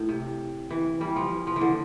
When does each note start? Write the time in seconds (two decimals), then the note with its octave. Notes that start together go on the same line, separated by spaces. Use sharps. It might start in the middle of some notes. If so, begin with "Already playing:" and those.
Already playing: A2
0.09 C3
0.71 E3
1.01 E3 G3
1.16 F3
1.47 F3
1.56 E3
1.61 D3